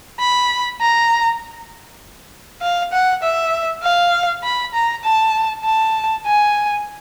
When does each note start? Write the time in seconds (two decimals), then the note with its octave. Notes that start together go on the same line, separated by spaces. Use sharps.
0.20 B5
0.81 A#5
2.61 F5
2.92 F#5
3.23 E5
3.83 F5
4.44 B5
4.74 A#5
5.04 A5
5.65 A5
6.26 G#5